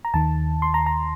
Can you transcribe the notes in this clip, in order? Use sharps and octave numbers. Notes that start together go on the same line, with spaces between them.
A#5
D#2 D#3 A5
C6
A#5
A#5